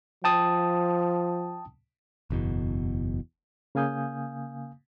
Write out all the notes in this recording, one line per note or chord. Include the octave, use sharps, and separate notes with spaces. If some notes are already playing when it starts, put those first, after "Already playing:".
F3 G5 A5 D#6
F#1 E2 B2
C#3 A#3 F5 G#5 D#6 G6